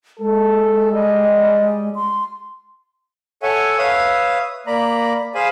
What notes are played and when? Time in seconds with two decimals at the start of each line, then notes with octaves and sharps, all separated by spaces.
0.20 G#3 A4
0.92 G3 D#5
1.95 C6
3.42 A4 C#5 E5 F#5 G#5
3.78 B4 C#5 E5 F5 D#6
4.67 A#3 D5 A#5 B5
5.35 G#4 C5 F5 G#5 B5